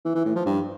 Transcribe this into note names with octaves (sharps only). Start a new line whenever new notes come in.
E3
E3
A2
F3
G2